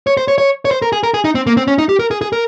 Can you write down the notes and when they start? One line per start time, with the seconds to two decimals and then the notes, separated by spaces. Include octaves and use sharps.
0.07 C#5
0.17 C5
0.28 C#5
0.38 C#5
0.65 C#5
0.71 C5
0.82 A#4
0.93 G#4
1.03 A#4
1.14 G#4
1.24 D#4
1.35 C4
1.47 A#3
1.57 C4
1.68 C#4
1.78 D#4
1.89 G4
1.99 A#4
2.11 G#4
2.21 G#4
2.33 A#4